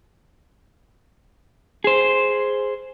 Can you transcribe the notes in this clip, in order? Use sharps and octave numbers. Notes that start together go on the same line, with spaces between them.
G#4 C5